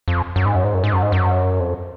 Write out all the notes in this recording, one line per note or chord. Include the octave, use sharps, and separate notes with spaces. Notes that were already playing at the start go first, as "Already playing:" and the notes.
F2
F#2
G#2
F#2
G#2
F#2
G#2
F#2
G#2
F#2
F2